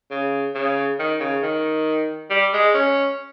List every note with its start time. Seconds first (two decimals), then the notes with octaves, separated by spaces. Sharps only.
0.11 C#3
0.55 C#3
0.99 D#3
1.20 C#3
1.43 D#3
2.30 G3
2.53 G#3
2.74 C#4